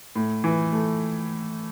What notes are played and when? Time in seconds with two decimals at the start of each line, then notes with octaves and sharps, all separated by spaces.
0.15 A2
0.44 E3
0.73 A3